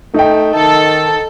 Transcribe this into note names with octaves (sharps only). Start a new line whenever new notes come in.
A3 D#4 G5
D#3 A4